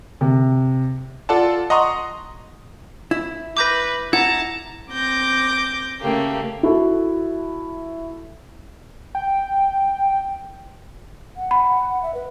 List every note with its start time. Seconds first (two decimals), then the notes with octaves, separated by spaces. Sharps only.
0.21 C3
1.29 F4 A4 D5 F#5 A5
1.70 D#5 F#5 A#5 C6 C#6 D#6
3.11 E4
3.57 B4 D6 G6 A#6
4.13 E4 F#5 A5 A#5
4.90 C4 D6 G6 A#6
6.00 C#3 A3 A#3 G4
6.63 E4 F#4 A4
9.15 G5
11.37 F#5
11.51 B5
12.03 E5
12.14 B4